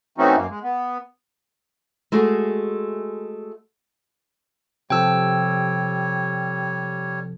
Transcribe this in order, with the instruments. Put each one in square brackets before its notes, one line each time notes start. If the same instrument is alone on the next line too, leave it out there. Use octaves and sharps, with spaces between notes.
[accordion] E3 A3 C4 C#4 D#4 F#4
F#2 A#3
G#3
B3
[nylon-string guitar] G#3 A3 F#4 G#4
[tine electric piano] C3 F3 A4 [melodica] G3 C#5 [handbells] G5 E6